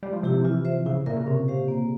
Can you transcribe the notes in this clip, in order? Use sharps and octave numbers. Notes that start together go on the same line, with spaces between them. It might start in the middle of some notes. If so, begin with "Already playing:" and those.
G3 G#3
F3
C3 E4 G4
C3
E3 F4
C5 E5
C#3 E4
A#2 A#4 E5
C#3
C3 C#4
G4 C5 F5
A#3